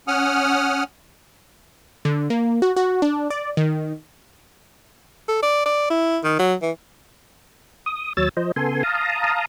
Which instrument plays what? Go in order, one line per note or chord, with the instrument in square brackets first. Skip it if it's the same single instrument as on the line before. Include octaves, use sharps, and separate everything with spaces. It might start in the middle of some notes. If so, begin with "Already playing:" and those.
[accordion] C#4 F#5 D#6 F6
[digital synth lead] D3
A#3
F#4
F#4
D4
D5
D#3
[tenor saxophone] A4
D5
D5
E4
D#3
F#3
E3
[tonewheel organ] D#6
D#2 F#3 C#5 E6 A6
F3 C5 D#5
C#3 B3 A4 G#5 C6
F5 A5 A#5 D#6